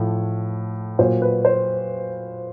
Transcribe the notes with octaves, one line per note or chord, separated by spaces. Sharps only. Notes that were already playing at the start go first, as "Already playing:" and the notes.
Already playing: A2 F3
A#2 F#3 C5
B4
C5